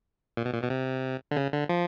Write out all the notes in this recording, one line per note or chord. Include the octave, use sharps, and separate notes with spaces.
A#2
B2
A#2
B2
C3
D3
C#3
D3
F3